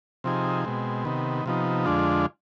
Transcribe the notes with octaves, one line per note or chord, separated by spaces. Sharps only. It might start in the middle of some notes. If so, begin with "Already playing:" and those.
C3 F3 C4 D#4 G#4
B2 G#3 C4
C3 D#3 B3
C3 F3 B3 D#4
F2 D3 G#3 D4 F4